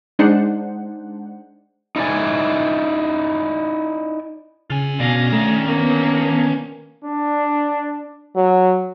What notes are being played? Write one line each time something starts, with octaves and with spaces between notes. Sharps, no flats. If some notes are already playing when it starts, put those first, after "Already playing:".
G#3 D4 D#4 C5 F#5
D#4 E4 D5 G#5
C#3 F4 G#5
B2 C#4 D4 F5 A#6
D#3 A3
A#3 B3
D4
F#3